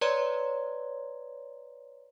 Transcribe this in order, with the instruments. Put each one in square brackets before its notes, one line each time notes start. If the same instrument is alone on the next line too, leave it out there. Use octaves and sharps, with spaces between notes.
[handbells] B4 C#5 D5 A#5 C6 G#6